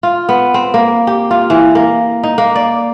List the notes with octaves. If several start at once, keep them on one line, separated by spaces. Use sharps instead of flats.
F4
B3
C4
A#3
G4
F4
E3
A#3
D#4
A#3
D5